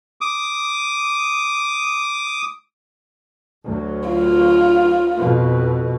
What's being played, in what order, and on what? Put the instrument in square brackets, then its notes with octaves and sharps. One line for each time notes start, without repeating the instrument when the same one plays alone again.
[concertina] D6 D#6
[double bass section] D2 F#3
[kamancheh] F4
[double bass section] F2 B2